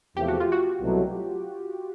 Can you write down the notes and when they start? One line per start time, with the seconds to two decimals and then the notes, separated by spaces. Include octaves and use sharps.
0.16 E2 C3 F3 A3 G4
0.28 F#4
0.40 F4
0.52 F#4
0.80 C2 B2 F#3 A3